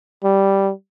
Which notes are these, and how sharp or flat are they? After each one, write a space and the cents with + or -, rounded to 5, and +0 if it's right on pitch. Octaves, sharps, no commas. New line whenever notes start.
G3 -5